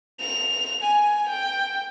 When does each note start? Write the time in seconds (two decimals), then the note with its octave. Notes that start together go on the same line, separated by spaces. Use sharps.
0.20 F7
0.82 G#5
1.28 G5